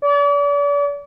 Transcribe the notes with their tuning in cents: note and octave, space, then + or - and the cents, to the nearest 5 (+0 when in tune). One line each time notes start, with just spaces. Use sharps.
D5 -40